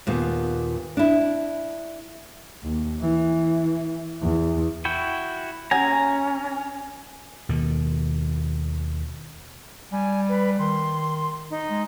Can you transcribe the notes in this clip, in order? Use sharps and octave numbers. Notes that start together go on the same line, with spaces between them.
D#2 A#2 B3
D4 E4
D#2
E3
E2
E4 F#4 G5
C#4 G#5 A#5
D#2 B2 D#3
G3 G#5
B4
D#3 C6
D#4
G#3